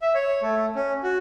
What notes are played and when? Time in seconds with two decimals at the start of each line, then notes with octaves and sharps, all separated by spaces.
0.02 E5
0.14 C#5
0.42 A3
0.75 C#4
1.03 F#4